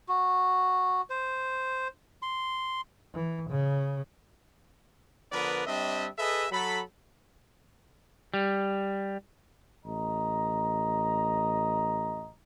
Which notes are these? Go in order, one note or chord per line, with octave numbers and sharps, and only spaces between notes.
F#4
C5
C6
E3
C#3
D3 F3 B3 A#4 B4 D5
G3 C4 D4 D#5 E5
G#4 A4 B4 D#5 E5
F#3 A4 B5
G3
A1 D#5 A#5